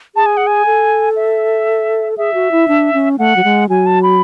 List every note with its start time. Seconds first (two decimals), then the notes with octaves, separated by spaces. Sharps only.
0.15 G#4 A5
0.26 G#5
0.37 F#5
0.47 G#5
0.66 A4
1.16 E5
2.18 G#4 E5
2.34 F#4
2.51 E4
2.68 D4
2.93 C#4
3.19 A3 F#5
3.36 F#3
3.44 G#3
3.69 F#3 G#5
3.86 A5
4.03 B5